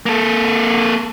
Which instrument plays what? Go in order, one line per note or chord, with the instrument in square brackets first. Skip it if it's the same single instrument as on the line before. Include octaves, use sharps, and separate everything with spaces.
[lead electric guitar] A#3 A4